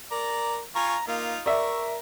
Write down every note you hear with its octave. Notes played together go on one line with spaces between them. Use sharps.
A#4 D5 A#5
F4 G#5 A#5 C#6
A#3 D#4 F4
A#4 D5 E5 C#6